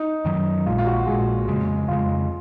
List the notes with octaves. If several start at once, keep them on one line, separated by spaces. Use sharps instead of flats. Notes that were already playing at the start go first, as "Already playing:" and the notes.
Already playing: D#4
F#2 D#3 F#3
A#1 A#2 G#3 F4
F4
F#4
A#1 A#2 G#3 G#4
F2 C#3 G#3
F2 C#3 G#3 F4